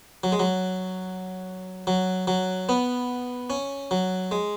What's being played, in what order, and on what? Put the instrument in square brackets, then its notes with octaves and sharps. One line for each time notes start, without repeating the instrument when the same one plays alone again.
[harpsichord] F#3
G#3
F#3
F#3
F#3
B3
C#4
F#3
G#3